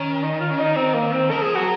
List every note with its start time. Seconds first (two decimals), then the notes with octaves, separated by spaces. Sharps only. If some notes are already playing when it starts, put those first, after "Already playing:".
Already playing: D#3 C#4
0.23 D#4
0.40 F4
0.50 C#4
0.59 D#4
0.76 C4
0.94 A#3
1.12 C4
1.31 F3 A#4
1.42 G#4
1.55 F#3 F#4